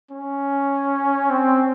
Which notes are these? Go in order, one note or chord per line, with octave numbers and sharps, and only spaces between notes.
C#4
C4